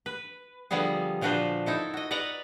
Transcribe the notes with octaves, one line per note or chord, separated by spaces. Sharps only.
B4
D3 F3 G3 B3 G#4
A#2 F3 D4 F#4 B4 C5
D#4 E4 A4
F#4 D#5
B4 D5 D#5 F#5 A#5